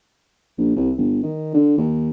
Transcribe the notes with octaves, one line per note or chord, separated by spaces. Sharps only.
A#1
C2
G1
D#3
D3
D#2